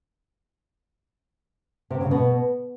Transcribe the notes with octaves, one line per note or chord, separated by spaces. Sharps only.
C3
C#3
B2